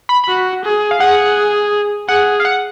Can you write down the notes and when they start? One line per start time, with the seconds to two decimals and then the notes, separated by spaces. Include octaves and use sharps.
0.09 B5
0.24 F#4 B5
0.64 G#4
0.91 F5
1.00 G#4 F#5
2.09 G#4 F#5
2.40 F5
2.45 F#5